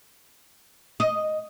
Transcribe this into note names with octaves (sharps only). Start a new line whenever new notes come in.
D#5